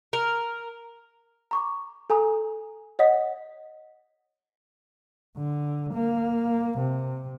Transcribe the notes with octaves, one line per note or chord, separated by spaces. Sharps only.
A#4
A#5 C#6 D6
A4 G#5 A#5 D#6
C#5 D#5 F#5 D#6 B6
D3
A#3
C3